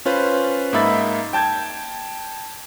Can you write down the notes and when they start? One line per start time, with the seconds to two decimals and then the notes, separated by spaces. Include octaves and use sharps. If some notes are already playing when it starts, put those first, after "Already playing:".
0.06 C#4 F4 B4 C5
0.73 G#2 A#3 D#4 E5 B5 A6
1.33 G5 A5 G6 G#6